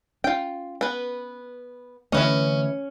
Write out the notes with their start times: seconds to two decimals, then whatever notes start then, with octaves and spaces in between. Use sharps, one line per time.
0.24 C#4 F4 G5
0.81 B3 B4
2.12 D3 E3 A3 C#4 E4 B4 D#5